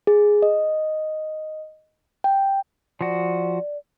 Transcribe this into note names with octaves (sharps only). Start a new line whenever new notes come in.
G#4
D#5
G5
F3 F#4 D5